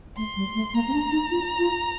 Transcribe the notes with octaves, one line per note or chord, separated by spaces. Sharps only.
A3 C6
G3
A3
A#3 A#5
C4
D4
D#4
F4
F4